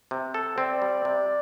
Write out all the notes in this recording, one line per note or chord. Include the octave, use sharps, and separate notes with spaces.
C3
A4
C4 D5
G3
C3